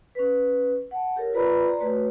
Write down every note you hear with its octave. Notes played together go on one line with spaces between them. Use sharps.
C#4 B4
F#5 A5
G4 A4 A#4 C#5
F4 B4 D5 A#5 B5
C5 D5 A#5 C6
A3 F#4 B4 C#5